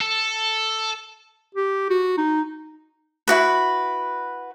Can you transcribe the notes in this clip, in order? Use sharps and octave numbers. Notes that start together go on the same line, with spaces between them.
A4
G4
F#4
D#4
E4 F#4 B4